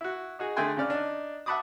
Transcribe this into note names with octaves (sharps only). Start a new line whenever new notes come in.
E4 F#4
D#4 F#4 G#4
D3 A3 G#4 G5 G#5 C6
C#3 C#4 D5 F6
D4 D#4
E5 F#5 A5 B5 D6 D#6